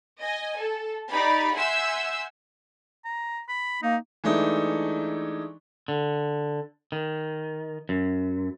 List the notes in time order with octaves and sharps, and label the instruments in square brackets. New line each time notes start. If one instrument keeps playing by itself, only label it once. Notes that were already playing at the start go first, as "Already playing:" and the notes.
[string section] D#5 G#5
A4
D#4 G4 D5 B5
E5 F#5 G#5 C6 E6 G6
[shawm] A#5
B5
[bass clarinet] A#3 [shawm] D#4
[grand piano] E3 G#3 A3 D4 D#4
[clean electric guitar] D3
D#3
F#2